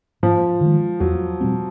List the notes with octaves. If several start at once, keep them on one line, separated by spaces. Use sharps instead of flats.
G#2 F3
D#3 G#3
E2 F#3
B2 G3 C4